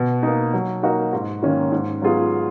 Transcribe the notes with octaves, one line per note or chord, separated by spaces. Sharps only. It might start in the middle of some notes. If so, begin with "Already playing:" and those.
Already playing: B2
A#3 D#4
F#3
A#3 D#4 F#4 A#4
G#2
D#3 A#3 C#4
G#2
F#3 B3 F4 G#4